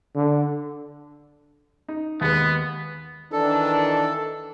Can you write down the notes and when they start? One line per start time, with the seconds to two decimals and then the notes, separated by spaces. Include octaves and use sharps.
0.16 D3
1.88 D#4
2.21 D#2 G#3 B3 B4
3.32 D#3 E3 D4 A4